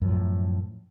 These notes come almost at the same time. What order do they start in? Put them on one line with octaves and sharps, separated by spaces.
F#2 F3 A2